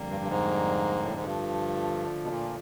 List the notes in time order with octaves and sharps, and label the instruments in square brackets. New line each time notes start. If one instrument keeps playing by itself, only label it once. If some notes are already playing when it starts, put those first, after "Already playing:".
Already playing: [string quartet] F2 D3 G3 A#3
[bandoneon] G2
G2
G#2
A2
G#2
[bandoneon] G2 [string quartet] D3 F3 A3
[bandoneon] B2
A#2